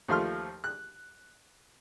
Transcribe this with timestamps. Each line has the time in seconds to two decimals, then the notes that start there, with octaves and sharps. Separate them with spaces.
0.08 D#2 F3 A3 F4 C6 F6
0.64 F#6